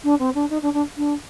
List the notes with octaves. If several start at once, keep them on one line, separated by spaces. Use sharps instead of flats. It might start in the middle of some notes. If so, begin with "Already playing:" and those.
D4
C4
D4
D#4
D4
D4
D4